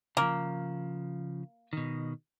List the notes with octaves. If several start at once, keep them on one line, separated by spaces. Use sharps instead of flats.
C#3 F3 A#3
B2 D#3